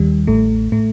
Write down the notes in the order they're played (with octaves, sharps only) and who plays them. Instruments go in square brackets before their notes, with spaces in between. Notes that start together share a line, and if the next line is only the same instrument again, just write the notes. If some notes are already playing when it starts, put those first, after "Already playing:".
Already playing: [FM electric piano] D#2 D#3 G3
A1 A2 A3
A2 A3